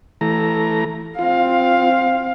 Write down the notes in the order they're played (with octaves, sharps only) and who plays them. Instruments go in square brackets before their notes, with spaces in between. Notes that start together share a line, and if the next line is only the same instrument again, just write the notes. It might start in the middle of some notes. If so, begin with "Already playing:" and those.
[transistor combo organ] E3 A3 A#5
[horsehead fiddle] C4 F5 [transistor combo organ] F4